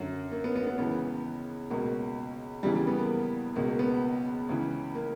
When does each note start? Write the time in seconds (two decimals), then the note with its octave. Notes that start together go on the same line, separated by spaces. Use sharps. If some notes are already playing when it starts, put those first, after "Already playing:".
Already playing: F#2 D3
0.32 A#3
0.44 B3
0.56 B3
0.67 B3
0.78 C#2 C#3 E3 B3
1.70 C#2 B2 A#3
2.63 E2 C#3 E3 G3
2.75 G3
2.87 B3
2.99 A#3
3.56 C#2 B2 A#3
3.68 A#3
3.79 B3
4.49 C#2 C#3 E3
4.95 A#3